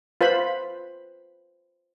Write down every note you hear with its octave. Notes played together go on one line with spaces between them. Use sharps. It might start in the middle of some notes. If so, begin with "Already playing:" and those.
F4 B4 C5 B5